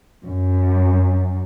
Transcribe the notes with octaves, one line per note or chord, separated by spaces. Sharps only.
F#2